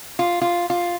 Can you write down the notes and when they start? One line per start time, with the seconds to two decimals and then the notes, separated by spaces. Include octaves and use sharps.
0.19 F4
0.41 F4
0.70 F4